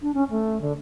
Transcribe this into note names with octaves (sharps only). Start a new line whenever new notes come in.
D4
C#4
A3
D3